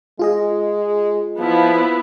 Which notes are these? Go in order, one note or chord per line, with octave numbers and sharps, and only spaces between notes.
G#3 F4 G#4 D#5
F3 B3 E4